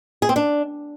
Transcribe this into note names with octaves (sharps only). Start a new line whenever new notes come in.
G#4
C4
D4